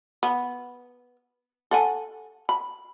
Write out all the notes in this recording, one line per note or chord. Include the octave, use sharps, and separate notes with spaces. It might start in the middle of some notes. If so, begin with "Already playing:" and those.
B3
A4 F#5 G#5
B5